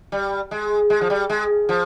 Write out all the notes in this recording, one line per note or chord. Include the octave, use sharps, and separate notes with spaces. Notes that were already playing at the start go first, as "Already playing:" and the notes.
G3
G#3
G#3
F3
G3
G#3
F3